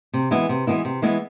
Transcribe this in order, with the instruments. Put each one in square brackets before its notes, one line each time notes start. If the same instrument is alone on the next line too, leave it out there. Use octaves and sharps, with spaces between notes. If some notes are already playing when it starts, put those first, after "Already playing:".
[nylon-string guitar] C3
E3 G#3 B3 E4
C3
E3 G#3 B3 E4
C3
E3 G#3 B3 E4